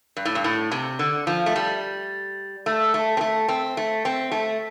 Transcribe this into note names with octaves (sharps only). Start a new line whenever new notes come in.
G2
A2
G2
A2
C3
D3
F3
A3
G3
A3
A3
C4
A3
C4
A3
C4
A3